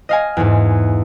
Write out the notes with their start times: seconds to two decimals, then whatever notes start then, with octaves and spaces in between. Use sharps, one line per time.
0.09 D#5 F5 G#5
0.37 E2 G#2